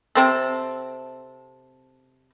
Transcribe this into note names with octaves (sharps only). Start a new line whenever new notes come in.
C3 C4 A4